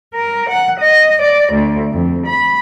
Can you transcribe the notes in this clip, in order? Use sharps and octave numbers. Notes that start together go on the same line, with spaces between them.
A#4
F#5
D#5
D5
D2
F2
B5